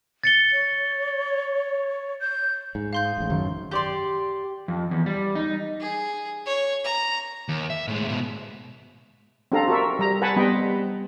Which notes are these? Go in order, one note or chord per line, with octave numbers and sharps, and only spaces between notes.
A6 C#7 G7
C#5
G6
G#2
F5 C6 G6
D#6
A1 G#2
F#2 D#3 A5
G4 D5 C6
F2
E2
G3
D#4
G#4
C#5
A#5
D#2
E5
A2 G#3
G#2 B2
C4 D4 G4 A4 F5 A#5
F#4 A4 A#4 E5
G3 A#5
B4 F#5 G#5 A5 B5
G3 B3 C4 D#5 G5 B5